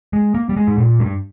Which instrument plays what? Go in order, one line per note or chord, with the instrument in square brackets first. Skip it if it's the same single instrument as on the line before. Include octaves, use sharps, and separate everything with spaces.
[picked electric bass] G#3
A#3
G3
G#3
G#2
A#2
G2